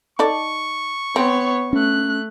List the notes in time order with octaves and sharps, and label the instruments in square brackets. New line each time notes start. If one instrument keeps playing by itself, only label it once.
[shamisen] D#4 A4 D5 [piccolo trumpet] C#6
[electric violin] B3 C#5 [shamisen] C4
[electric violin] A3 F#6 [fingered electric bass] C#4